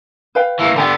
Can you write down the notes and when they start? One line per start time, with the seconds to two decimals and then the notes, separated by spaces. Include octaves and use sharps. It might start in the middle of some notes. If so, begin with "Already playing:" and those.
0.35 B4 F5 G5
0.59 E3 A#3
0.76 D3 B3 F5 G5 A#5